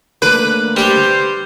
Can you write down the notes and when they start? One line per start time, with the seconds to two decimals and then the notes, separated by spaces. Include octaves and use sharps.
0.22 D3 A3 A#3 B4 D6
0.77 G3 G4 C5